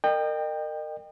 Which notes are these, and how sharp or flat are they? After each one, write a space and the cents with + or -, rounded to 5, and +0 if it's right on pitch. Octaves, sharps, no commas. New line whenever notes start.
A#4 -25 D#5 -35 G5 +10